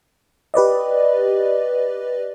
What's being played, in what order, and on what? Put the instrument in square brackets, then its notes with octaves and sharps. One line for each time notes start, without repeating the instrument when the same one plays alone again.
[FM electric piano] G4 B4 D5 D#5